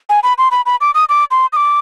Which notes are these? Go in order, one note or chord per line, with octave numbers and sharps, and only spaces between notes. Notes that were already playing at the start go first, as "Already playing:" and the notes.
G#5
B5
C6
B5
B5
D6
D#6
D6
C6
D#6
D6